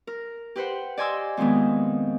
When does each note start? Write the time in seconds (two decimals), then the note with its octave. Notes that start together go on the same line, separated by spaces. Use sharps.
0.07 A#4
0.56 G4 B4 C5 F#5
0.97 D5 D#5 G#5 C6 D6 E6
1.37 F2 A#2 D#3 G#3 B3